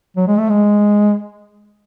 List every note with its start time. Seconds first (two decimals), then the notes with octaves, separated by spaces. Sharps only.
0.17 F#3
0.28 G#3
0.38 A3
0.49 G#3